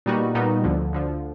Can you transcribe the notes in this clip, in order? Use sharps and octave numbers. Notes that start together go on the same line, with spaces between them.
A#2 G3 B3 D#4 F#4
A#2 G3 B3 D#4 F#4
D2 D3 F3
D2 D3 F3